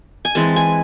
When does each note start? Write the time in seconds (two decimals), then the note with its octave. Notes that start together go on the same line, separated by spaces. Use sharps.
0.25 G#5
0.35 E3 G#3 C4 A5
0.56 G#5